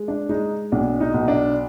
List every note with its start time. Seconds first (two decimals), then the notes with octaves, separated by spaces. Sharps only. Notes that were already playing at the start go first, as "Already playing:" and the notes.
Already playing: G#3
0.08 D4
0.29 G#3 D#4
0.72 B1 D4
1.00 D#4
1.14 B1
1.28 D4